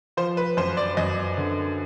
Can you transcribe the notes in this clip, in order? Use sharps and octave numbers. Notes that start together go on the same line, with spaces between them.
F3 C5
B4
F#2 C5
D5
F#2 D#5
D3